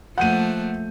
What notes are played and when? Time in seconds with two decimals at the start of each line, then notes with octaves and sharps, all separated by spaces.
0.18 F3 A3 A#3 F#5 G6 D#7